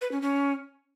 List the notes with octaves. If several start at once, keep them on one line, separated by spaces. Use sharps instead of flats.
B4
C#4
C#4